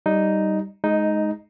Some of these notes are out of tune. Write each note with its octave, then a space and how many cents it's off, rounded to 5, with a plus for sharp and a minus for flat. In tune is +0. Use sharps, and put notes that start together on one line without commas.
G3 -10 D#4 +0
G#3 +20 D#4 +0